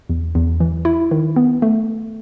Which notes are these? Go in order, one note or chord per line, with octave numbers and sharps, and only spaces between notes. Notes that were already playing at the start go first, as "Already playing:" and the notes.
E2
E2
E3
E4
D#3
B3
A3